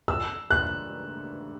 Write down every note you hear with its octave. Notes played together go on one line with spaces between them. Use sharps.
E6
F#6